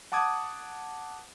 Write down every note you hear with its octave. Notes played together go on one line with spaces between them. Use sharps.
F#5 A5 D6 D#6 G#6